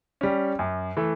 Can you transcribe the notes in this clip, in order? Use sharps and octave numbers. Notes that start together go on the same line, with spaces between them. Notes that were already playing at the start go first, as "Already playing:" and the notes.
G3 C#4
F#2
E3 A3